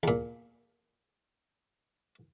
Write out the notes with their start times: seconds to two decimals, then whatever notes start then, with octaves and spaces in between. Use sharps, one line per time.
0.03 E2 A#2